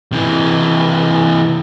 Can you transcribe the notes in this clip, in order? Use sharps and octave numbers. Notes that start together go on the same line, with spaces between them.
C3 E3